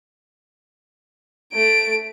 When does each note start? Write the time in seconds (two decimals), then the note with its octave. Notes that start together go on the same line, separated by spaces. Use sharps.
1.53 A3 D7